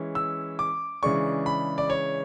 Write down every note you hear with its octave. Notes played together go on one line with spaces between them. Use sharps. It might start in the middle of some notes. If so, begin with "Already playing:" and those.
Already playing: E3 G#3 C#4
E6
D6
C#3 E3 G#3 D4 C#6
B5
D5
C#5